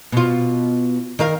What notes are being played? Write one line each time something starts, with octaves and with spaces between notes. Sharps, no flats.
B2 F4
D#3 A#4 F5